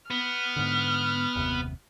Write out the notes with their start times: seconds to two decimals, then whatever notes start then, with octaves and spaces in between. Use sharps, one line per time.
0.11 B3 F6
0.56 G#2 D3
1.36 F#1 D#2 C3